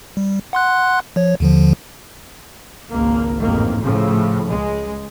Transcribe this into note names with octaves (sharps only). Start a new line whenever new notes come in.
G3
F#5 C6 F#6
F3 C#5
D#2 D3 F3
G#1 C#2 A#3
A1 F2 G#2 D#3 A#3
A2 C#3 F3 A3
C#2 G#3